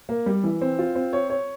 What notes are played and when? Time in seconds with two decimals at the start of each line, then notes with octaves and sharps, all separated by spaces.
0.09 A#3
0.26 G3
0.44 E3
0.61 C4
0.79 F4
0.95 C4
1.13 C#5
1.30 C#5